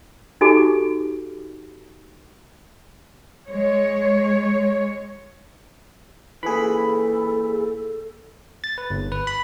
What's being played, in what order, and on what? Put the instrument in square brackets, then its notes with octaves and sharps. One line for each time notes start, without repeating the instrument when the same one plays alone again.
[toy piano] D#4 F#4 G4 A4 G#5 D6
[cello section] G#3 C#5
[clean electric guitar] A#2 E3 [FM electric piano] G#4 B5 [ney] A4
[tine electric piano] A6
B4
G1
B4
B5